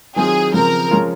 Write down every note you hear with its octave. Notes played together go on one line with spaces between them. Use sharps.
D#3 F#3 C4 F4 G#4
C#3 F3 C4 A#4
F3 G#3 C#4 F4